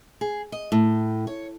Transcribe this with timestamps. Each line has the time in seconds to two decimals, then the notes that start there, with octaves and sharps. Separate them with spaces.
0.21 G#4
0.52 D#5
0.72 A2
1.27 C#5